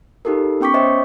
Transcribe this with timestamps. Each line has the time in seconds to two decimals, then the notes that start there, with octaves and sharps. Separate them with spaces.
0.25 D#4 F4 G4 A4 A#4
0.61 B3 C#4 G5 C#6 D6 B6
0.74 C5 C#5 D#5 E5 G5